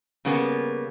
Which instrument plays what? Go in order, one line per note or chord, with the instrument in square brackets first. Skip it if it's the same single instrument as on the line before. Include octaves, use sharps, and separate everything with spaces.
[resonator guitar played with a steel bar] C#3 G3 A#3 B3